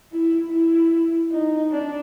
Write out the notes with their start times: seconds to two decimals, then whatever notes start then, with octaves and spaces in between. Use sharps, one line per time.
0.12 E4
0.51 E4
1.31 D#4
1.71 D4